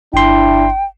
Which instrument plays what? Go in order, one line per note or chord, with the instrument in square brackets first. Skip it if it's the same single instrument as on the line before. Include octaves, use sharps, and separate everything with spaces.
[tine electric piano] G1 C6 [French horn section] D4 E4 [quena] G5